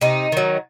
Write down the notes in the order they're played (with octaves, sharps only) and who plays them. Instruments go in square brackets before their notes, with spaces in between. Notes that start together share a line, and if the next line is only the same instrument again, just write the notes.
[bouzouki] C3 D#4
D#3 F#3